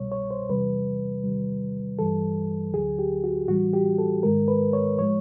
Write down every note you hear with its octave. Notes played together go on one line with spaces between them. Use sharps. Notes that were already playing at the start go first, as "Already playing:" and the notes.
Already playing: C2 B2 G3 C#5
C#5
C5
E2 C3 E3 G3 B4
E2 C3 D#3 G3
G2 E3 G3 A4
D2 D3 F#3 G#4
G4
F#4
A2 E3 G3 F#4
G4
A4
G#2 D#3 G#3 A#4
B4
C#5
A2 F3 G#3 C#5